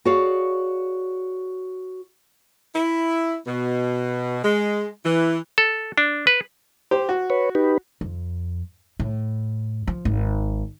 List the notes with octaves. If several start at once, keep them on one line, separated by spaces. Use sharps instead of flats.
F#4 G#4 C#5 D5 F5
E4
B2
G#3
E3
A4
D4
B4
G4 C5
F#4
B4 C#5
D#4 G4 B4
F2
A2
F3
G#1